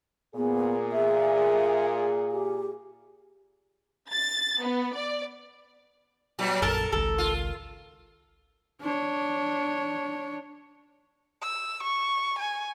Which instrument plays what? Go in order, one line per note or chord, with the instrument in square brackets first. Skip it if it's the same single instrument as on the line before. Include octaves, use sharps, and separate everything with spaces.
[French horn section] A#2 G#4 [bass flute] B3
[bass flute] E5
G4
[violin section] A6
B3
D5
[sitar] A#2 F#3 G3
[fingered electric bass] A#1 F#2 [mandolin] A4 A5 [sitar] A#4
[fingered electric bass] G#1 C#2 [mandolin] A4
[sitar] F4
[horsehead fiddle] D4 C#5
[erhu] E6
C#6
G#5